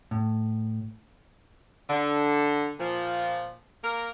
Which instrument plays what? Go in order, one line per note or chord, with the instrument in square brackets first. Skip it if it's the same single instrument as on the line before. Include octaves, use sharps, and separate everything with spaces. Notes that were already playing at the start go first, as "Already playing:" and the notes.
[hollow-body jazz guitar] A2
[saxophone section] D3
A#2 F3
A#3 A#4